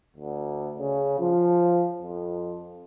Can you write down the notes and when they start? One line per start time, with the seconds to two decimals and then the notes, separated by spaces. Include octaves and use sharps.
0.17 D2
0.79 C#3
1.20 F3
2.02 F2